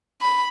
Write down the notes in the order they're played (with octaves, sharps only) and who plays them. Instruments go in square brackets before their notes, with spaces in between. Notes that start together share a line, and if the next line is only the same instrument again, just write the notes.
[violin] B5